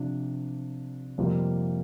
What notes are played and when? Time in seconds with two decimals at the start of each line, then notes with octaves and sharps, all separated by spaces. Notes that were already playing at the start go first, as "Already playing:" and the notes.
Already playing: C3 F3 D4
1.18 F2 C3 G3 A#3 F4